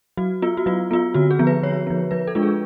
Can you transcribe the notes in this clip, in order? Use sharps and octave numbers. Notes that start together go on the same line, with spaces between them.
F#3 F#4
B3 F4
F#4
F#3 F4
B3 F4
D3 F#4
G#4
F3 B3
B4
D3 C#5
F3 B3
F3 B4
A4
G#3 D4 F4
G#4